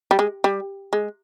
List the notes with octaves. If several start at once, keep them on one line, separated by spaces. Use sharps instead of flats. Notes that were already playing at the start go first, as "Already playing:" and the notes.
G3
G#3
G3
G#3